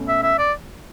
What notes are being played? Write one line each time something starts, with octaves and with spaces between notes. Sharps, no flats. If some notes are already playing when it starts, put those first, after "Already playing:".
Already playing: B2 A3 C#4
E5
E5
D5